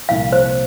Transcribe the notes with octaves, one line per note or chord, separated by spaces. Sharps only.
C2 A#2 F3 F5
C5